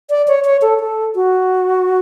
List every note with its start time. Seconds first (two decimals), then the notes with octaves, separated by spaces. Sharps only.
0.10 D5
0.28 C#5
0.45 C#5
0.62 A4
0.80 A4
1.15 F#4